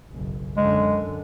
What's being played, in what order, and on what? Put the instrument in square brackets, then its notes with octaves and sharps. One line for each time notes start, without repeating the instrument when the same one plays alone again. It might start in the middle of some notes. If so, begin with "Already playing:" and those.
[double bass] F#1 B1
[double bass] F#2 D3 [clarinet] G#3